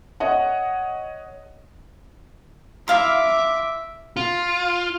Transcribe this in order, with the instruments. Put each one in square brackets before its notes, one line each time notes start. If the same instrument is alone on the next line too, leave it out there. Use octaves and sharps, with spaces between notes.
[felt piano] C#5 D#5 F#5
[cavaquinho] E4 F5 C6 [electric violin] E5 D6
[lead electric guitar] F4